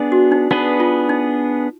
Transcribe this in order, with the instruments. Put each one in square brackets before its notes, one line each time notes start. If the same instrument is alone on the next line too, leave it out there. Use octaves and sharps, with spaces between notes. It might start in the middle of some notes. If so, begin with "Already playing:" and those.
Already playing: [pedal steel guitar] B3 D4 G#4 D5
[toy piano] F#4
D#4
[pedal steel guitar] B3 D4 G#4 B4 [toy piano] D#4
[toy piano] F4
D#4